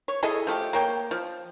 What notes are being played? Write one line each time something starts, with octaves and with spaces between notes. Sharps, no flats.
C#5
E4 G#4 A4 D#5
F3 A3 G4
A#3 C#5 G5
F3